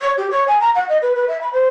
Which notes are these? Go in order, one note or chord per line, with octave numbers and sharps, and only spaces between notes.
C#5
G4
C#5
G#5
A#5
F#5
D#5
B4
B4
E5
B5
C5